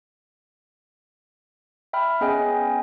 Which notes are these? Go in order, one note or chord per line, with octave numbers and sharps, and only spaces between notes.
E5 G5 B5 F6
B3 C#4 G#4 D#5 G5 G#5